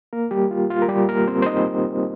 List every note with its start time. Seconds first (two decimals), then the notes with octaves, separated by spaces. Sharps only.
0.13 A#3 A#4
0.31 G3 G4
0.51 F4
0.70 F4
0.82 A#4
0.89 G3 G4
1.09 A#3 A#4
1.28 C4 C5
1.42 C5
1.46 D#4 D#5